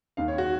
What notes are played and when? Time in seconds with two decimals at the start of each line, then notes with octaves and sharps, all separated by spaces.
0.17 D#2 D#3 F5
0.28 C#5
0.38 F#4